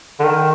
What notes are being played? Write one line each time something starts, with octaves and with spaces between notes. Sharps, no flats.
D3
D#3